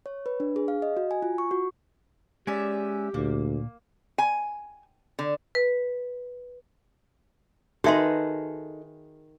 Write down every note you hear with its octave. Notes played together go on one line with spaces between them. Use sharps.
C#5
B4
D4
G#4
F5
D#5
F#4
G#5
F4
C#6
F#4
G#3 C#4 G4 D5 E5 G#5
D2 A#2 A#3
G#5
D3
B4
D#3 D#4 F#4 G#4 A4 B4 E5 C6